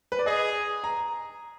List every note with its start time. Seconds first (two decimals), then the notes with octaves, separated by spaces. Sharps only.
0.12 B4
0.19 D5
0.26 G#4 D#5
0.84 A#5